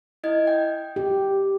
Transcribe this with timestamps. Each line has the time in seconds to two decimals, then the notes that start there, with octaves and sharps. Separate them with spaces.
0.24 E4 D#5 G#6
0.47 G5
0.96 G4